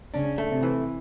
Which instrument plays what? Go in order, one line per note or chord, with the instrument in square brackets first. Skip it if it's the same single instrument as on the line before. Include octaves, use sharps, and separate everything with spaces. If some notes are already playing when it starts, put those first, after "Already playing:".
[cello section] C#3 C#4 [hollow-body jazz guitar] D4
[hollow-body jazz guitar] A3
[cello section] C3 C4
[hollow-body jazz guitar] E3